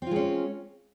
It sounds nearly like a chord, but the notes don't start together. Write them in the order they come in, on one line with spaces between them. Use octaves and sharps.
C4 F4 G#3 C#4